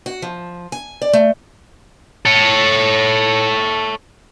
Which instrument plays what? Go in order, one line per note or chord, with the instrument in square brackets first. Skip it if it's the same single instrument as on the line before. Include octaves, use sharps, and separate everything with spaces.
[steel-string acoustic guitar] F#4
F3
G#5
D5
A3
[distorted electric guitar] A4 C#5